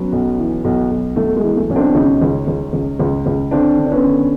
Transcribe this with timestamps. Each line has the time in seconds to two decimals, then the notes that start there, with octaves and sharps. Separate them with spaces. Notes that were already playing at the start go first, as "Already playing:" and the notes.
Already playing: F#3 B3 C#4
0.12 B1
0.39 E3
0.65 B1
0.90 B1
1.16 B1 A3
1.37 G#3
1.43 E3
1.56 A3
1.69 B1 C#4
1.76 C4 D4
1.95 C#2 C#4 D#4
2.21 C#2
2.47 C#2
2.73 C#2
2.99 C#2
3.26 C#2
3.51 D3 C4 D4
3.77 D3
3.87 D4
3.91 B3 C#4
4.05 D3